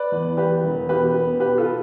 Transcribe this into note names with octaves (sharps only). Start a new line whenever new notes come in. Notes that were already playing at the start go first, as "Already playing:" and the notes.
Already playing: B4 D5
E2
E2 G4 B4
E1
B2 G4 B4
B3
B2 G4 B4
F4 A4
B2